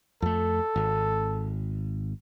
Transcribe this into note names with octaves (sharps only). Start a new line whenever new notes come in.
F2 A3 A4
G#1